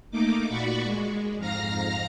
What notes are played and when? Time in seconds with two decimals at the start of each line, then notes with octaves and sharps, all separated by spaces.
0.11 A3 A#3 D#4 D6
0.48 A#2 F#4 D5 B5 C#6
0.83 G#3
1.37 F2 G#2 F5 A#5 F6 A#6